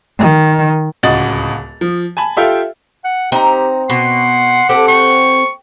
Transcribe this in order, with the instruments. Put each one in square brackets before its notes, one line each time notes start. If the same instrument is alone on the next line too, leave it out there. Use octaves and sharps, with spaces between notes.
[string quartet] D#3
[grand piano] D1 C#2 F#4 D#5 A6 F#7
F3
G#5 A5 B5
F4 G4 A4 E5 F5 G5
[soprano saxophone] F#5
[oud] C4 [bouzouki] D#4 A#5 [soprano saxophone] G4
[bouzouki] B2 [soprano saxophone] F#5 [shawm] C6
[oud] C4 G4 A4 [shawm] D6
[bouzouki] G5 [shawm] C#6